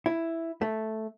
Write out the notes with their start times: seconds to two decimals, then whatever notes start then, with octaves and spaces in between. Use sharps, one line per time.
0.06 E4
0.61 A3